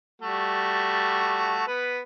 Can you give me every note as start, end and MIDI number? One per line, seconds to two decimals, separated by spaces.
0.22 1.63 55
0.22 1.63 57
0.22 1.63 66
1.67 2.00 59
1.67 2.00 71